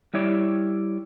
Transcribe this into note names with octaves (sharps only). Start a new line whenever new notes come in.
G3 E4 C#5 D5